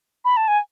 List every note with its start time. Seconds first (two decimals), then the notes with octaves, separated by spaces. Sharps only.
0.25 B5
0.37 A5
0.48 G#5